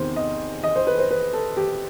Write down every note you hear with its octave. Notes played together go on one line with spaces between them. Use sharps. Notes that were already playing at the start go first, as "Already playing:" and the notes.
Already playing: E2 C3 D#3 C5
D#5
D#5
C5
B4
C5
B4
A4
G4